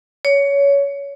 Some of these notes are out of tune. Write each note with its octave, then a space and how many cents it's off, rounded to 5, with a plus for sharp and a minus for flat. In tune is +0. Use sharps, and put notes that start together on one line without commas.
C#5 +20